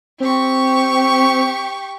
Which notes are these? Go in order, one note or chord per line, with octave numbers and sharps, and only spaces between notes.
C4 G4 C#6